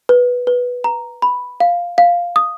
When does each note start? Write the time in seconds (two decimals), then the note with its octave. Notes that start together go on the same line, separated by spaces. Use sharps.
0.09 B4
0.47 B4
0.84 A#5
1.22 B5
1.60 F5
1.98 F5
2.36 D#6